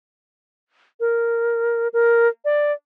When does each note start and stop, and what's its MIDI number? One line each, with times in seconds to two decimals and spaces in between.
1.00 1.88 70
1.93 2.28 70
2.45 2.72 74